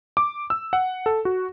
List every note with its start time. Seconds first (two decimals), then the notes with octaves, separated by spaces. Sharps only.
0.17 D6
0.50 E6
0.73 F#5
1.06 A4
1.25 F#4